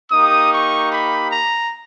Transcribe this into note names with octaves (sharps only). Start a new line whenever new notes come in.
A#3 D#4 G4 D#6
C#6
B5
A#5